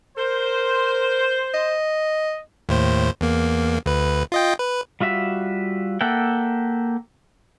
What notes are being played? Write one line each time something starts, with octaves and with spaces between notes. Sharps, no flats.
A#4 C5
D#5
D#2 A2 C5
E2 A#3
D2 B4
F4 D#5 G5
B4
G3 F4 F#4 E5
A#3 A4 E5 F#5 G5